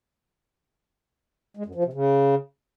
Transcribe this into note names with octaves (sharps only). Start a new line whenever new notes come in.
G#3
F#2
F3
C3
C#3